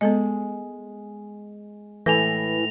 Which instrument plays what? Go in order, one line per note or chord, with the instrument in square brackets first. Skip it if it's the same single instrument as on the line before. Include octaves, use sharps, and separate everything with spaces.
[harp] G#3 [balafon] B3 A4 D#5
[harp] A2 [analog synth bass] E3 [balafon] A4 G#5 [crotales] A#6 F7